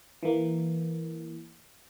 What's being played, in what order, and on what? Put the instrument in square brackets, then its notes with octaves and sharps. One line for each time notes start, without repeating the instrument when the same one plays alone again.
[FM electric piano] E3 A#3